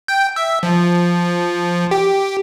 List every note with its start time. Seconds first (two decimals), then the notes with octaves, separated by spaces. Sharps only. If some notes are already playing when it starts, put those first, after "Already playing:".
0.08 G5
0.36 E5
0.63 F3
1.91 G4